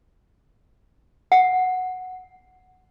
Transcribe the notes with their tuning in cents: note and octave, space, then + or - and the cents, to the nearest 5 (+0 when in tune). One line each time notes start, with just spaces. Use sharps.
F#5 -5